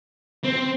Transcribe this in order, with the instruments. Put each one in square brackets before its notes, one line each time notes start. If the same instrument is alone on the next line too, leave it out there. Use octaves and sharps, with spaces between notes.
[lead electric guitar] C4